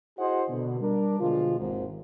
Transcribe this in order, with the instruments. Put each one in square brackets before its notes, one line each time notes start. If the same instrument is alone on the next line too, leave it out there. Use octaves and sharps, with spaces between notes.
[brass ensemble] E4 F#4 G#4 C5 D#5 F#5
B2 D3
G3 D4 A#4
B2 D3 F3 G#3 F4
G#1 D#2 G#2